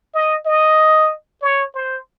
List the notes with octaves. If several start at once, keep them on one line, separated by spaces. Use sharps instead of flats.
D#5
D#5
C#5
C5